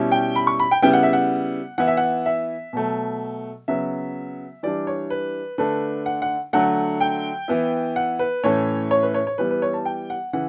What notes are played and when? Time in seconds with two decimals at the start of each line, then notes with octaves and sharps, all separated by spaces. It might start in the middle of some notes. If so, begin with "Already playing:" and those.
Already playing: B2 G3 C#4 E4
0.12 G5
0.36 B5
0.47 C#6
0.60 B5
0.71 G5
0.82 C#3 G3 B3 E4 G5
0.93 F#5
1.03 E5
1.13 F#5
1.78 E3 B3 E4 F#5
1.88 E5
1.97 F#5
2.26 E5
2.73 B2 F#3 A3
3.68 C#3 F#3 B3 E5
4.63 E3 G3 D4 D5
4.87 C#5
5.10 B4
5.58 D3 A3 D4 B4
6.06 F#5
6.22 F#5
6.53 D3 F#3 A3 F#5
7.01 G5
7.48 E3 B3 E4
7.96 F#5
8.19 B4
8.44 A2 E3 A3 C#4 C#5
8.91 C#5
9.03 B4
9.14 C#5
9.27 C#5
9.38 E3 G3 B3 B4
9.51 B4
9.62 C#5
9.73 A5
9.85 G5
10.10 F#5
10.33 C#3 E3 F#5